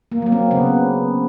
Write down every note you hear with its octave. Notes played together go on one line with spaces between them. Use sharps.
A#3
F#3 A#3
C4
C#3 B3